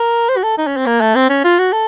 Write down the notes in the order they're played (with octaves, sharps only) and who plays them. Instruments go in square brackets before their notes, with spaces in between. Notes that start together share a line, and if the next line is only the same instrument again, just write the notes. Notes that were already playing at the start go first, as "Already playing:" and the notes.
Already playing: [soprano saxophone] A#4
C5
F#4
A4
D#4
C#4
C4
A#3
A3
C4
C#4
F4
F#4
A4